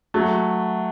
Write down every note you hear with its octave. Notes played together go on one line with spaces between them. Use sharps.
F#3 A3